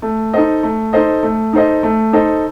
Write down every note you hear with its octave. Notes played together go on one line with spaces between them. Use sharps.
A3
D#4 A4 C5 D#5
A3
D#4 A4 C5 D#5
A3
D#4 A4 C5 D#5
A3
D#4 A4 C5 D#5